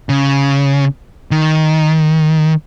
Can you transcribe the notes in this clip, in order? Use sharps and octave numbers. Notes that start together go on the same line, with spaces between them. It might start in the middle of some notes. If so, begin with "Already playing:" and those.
C#3
D#3